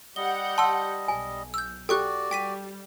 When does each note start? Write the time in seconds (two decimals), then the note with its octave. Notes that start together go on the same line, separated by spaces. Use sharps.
0.16 G3 G4 D#5 F#5 G6 G7
0.58 A5 C6 E6
1.08 B1 G#5
1.54 E6 G6
1.89 F#4 G4 A4 D5 G5 C#6 F#6
2.31 G3 G5 B6 D#7